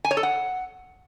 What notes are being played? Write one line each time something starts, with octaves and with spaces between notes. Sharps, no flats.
G#5
C#5
A4
F#5